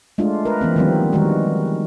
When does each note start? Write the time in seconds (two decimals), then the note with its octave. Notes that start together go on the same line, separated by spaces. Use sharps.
0.18 G#3 A3 D4 F4
0.45 A#4 B4
0.61 E3 A#3 C4
0.76 D#3 F3 G3 B3 C4
1.13 D#3 G3 G#3 F#4 A#4